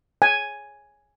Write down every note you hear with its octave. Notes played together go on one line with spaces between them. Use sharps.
G#5